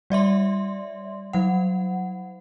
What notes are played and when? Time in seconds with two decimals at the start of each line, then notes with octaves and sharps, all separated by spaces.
0.10 G3 D5 E5 C6
1.33 F#3 F#5